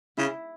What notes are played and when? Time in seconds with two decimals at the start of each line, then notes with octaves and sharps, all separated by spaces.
0.17 C#3 E4